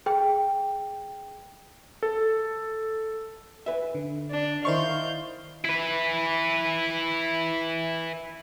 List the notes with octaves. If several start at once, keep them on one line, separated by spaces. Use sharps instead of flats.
G#4 G5
A4
B4 E5
D3
D4
D#3 E4 C5 D#5 F5 C#6 G6
E4 B4